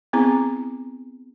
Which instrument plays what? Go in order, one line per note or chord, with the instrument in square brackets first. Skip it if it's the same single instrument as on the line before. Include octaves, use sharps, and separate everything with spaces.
[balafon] B3 C4 E4 G#4 A#5 D6